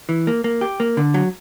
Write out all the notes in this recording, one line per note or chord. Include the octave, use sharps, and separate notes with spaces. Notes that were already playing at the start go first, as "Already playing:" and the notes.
E3
A#3
A#3
G4
A#3
D3
F#3